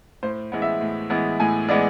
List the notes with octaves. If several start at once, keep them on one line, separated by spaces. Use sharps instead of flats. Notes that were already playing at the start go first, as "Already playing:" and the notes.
A2 C5
E3 G#3 B3
E5
A2
E3 G#3 B3
A2 G#5
E3 G#3 B3 D5